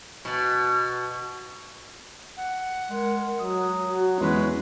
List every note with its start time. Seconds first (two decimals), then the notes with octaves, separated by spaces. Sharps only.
0.25 B2
2.37 F#5
2.90 G#3 A#4
3.39 F#3 F#4 D#6
3.87 F#4
4.21 E2 G#3 C#4 B4